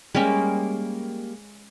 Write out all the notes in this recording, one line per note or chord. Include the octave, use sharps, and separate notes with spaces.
G3 G#3 A#3 C#4 G4